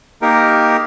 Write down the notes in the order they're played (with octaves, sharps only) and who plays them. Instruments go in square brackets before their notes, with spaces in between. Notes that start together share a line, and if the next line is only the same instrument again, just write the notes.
[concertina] A#3 D#4 G4 A#4